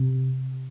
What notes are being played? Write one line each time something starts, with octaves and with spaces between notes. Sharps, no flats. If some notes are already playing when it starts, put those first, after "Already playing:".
Already playing: C3